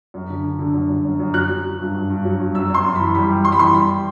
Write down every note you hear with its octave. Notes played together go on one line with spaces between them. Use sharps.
F#2
D3
D3
D3
F#2
F#2
F#2
F#2
F#3 F#6
F#3
F#3
G2
G2
G2
F#3
G2
F#2 E6
F#2 C6
F#2
B5
E3
G3 B5
G3
G3 C6
B5
E3 C6
G3 B5